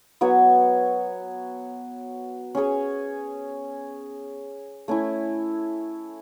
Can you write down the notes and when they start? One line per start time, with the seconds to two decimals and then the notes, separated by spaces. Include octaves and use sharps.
0.21 F#3 B3 F#4 C#5
2.55 C#4 G#4 C#5
4.88 A3 C#4 E4